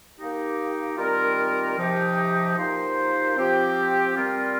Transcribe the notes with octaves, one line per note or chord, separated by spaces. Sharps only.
A#3 D#4 G4
D#3 G3 C4 F4 A#4
C3 F3 D#4 G4
A#2 A#3 D#4 G4 C5
F3 C4 G4
G3 C4 F4 A#4